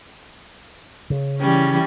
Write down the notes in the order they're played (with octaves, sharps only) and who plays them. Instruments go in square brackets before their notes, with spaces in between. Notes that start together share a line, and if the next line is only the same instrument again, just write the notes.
[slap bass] C#3
[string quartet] E3 G3 C#4